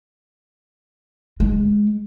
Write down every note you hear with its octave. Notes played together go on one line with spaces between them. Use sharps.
G#3